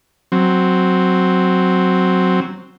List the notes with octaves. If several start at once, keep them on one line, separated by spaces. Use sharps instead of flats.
F#3 C4